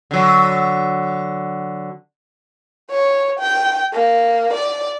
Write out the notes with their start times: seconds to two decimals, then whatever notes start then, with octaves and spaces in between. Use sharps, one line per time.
0.11 D3 F#3
2.90 C#5
3.40 G5
3.94 A#3
4.54 D5